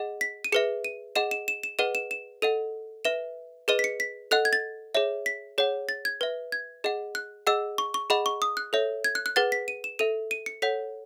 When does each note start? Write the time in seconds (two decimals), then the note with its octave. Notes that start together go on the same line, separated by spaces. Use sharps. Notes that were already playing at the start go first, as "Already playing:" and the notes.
Already playing: G#4 D#5 F#5
0.21 B6
0.44 D#7
0.52 G#4 B4 E5 C#7
0.85 D#7
1.16 G#4 D#5 F#5 E7
1.31 E7
1.48 E7
1.63 E7
1.79 G#4 B4 D#5 F#5 D#7
1.95 E7
2.11 E7
2.42 A4 D#5 F#5 D#7
3.05 B4 E5 E7
3.68 G#4 B4 D#5 D#7
3.79 B6
3.84 C#7
4.00 B6
4.31 A4 D#5 F#5 F#6
4.45 G#6
4.53 A6
4.95 G#4 C#5 E5
5.26 B6
5.58 G#4 C#5 F#5
5.89 A6
6.05 G#6
6.21 B4 E5
6.52 G#6
6.84 G#4 D#5 F#5
7.15 F#6
7.47 G#4 D#5 F#5 E6
7.78 C#6
7.94 C#6
8.10 G#4 D#5 F#5 B5
8.26 C#6
8.42 D#6
8.57 F#6
8.73 A4 C#5 E5
9.04 G#6
9.15 F#6
9.26 F#6
9.36 G#4 B4 F#5 A6
9.52 B6
9.68 D#7
9.84 E7
9.99 A4 E5 D#7
10.31 D#7
10.46 C#7
10.62 A4 C#5 F#5 B6